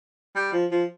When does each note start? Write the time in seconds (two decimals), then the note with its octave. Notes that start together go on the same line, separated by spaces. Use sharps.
0.35 G3
0.52 F3
0.71 F3